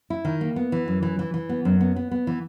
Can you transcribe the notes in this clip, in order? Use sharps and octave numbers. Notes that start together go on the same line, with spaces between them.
E4
D#3
A#3
B3
E3
F#2
E3
E3
E3
B3
F#2
B3
B3
B3
E3